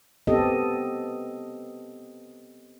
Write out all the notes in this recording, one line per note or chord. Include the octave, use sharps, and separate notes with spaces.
B3 C4 G4 A4 D#5